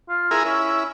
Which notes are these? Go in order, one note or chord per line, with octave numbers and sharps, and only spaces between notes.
F4
E4 G#4 A#4
C#4 E4